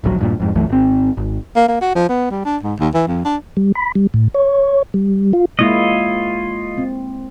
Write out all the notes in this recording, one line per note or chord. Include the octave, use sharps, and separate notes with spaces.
D1 A#1 B2 F#3
D#1 G2 A#2
F2 G#2
B1 F#2 E3 A3
G#1 C4
G#1
A#3
A#3
F#4
F3
B3
G3
D4
G#2
D#2
E3
F2
D4
G3
B5
G3
A2
C#5
G3
F4
G#3 A#3 E4 F4 C#5 D#5
C4